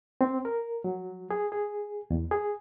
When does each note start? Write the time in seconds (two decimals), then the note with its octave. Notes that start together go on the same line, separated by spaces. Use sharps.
0.21 C4
0.45 A#4
0.84 F#3
1.31 G#4
1.52 G#4
2.11 E2
2.31 G#4